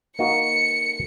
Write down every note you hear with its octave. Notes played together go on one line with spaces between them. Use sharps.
A#3 D#4 F#4 C#7